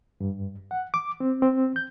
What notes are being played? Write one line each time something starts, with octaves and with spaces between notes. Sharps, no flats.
G2
F#5
D6
C4
C4
G6